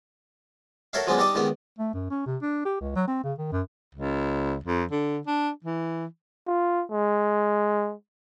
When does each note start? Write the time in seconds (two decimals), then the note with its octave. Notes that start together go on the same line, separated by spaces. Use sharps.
0.93 F#4 A4 A#4 C#5 E5 F5
1.07 F3 F#3 G#3 B3 C#4 D4
1.18 G3 D4 D#4 G4 D5 D#5
1.35 C#2 D#3 B3 G4
1.79 A3
1.93 F#2
2.11 C#4
2.26 C3
2.42 D4
2.65 G4
2.81 C#2
2.96 F#3
3.08 C4
3.24 C#3
3.39 D#3
3.53 F#2
3.95 C#2
4.64 F2
4.91 D3
5.27 D4
5.64 E3
6.47 F4
6.91 G#3